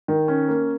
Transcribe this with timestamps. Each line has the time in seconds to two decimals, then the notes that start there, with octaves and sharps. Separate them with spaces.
0.08 D#3
0.28 C#4
0.49 A#3